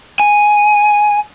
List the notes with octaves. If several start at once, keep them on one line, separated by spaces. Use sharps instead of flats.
G#5